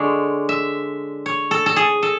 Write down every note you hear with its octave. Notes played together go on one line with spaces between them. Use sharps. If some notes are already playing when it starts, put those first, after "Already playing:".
Already playing: D3 G#3 D4 C#5
E5
C#5
A4
A4
G#4
A4